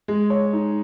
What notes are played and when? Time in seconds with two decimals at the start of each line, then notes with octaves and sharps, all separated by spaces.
0.08 G#3
0.30 C#5
0.53 D#4